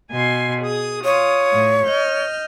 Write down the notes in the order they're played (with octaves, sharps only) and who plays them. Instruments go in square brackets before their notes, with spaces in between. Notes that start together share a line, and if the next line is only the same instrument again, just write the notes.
[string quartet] B2 G#5 C6
G#4 D#6
[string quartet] F4 D#6 [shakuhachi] C#5
[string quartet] A2
D#5 F6 G6